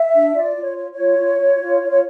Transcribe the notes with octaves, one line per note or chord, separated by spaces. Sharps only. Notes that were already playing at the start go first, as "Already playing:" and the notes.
Already playing: E5
D4
F4 D5
F4
C#5
C#5
C#5
F4
F4
F4
F4
F4
C#5